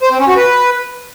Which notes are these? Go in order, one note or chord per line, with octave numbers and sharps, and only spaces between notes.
C5
C4
C#4
F#4
B4